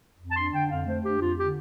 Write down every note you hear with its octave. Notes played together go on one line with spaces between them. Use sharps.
F2
A5
D4 C6
D3 G5
F2 F5
A3 C5
D4 G4
F2 F4
D3 G4